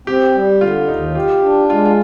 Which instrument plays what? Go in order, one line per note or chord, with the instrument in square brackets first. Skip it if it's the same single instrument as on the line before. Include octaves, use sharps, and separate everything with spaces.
[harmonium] C4 [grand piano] G4
[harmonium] G3
[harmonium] D3 [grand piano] F4
[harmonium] D#2 [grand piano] D#4
[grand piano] F4 [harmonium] G4
[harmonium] D4
[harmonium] G#3 [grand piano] F4
[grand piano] F4